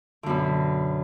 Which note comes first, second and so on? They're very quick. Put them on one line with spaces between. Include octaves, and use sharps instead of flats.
D3 F#2 B2